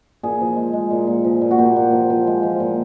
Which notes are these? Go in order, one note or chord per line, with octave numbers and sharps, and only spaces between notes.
A#2 G#4
F3
G#3
G#3
A#2
A#2
F3
A#2
F#4
A#2 G4
A#2
F3
F3
G#3
F3
A#2